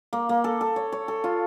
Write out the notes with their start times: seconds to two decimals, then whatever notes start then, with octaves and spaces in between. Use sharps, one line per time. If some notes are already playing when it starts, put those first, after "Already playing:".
0.13 A#3
0.29 A#3
0.44 A4
0.61 A4
0.76 C#5
0.92 C#5
1.08 A4
1.24 F4